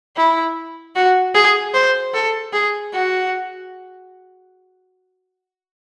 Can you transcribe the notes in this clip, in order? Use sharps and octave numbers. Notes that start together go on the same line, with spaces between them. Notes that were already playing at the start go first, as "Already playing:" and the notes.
E4
F#4
G#4
C5
A4
G#4
F#4